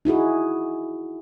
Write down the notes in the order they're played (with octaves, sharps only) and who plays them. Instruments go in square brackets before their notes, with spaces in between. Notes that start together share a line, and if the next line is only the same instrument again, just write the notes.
[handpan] D#4 E4 F#4 G#4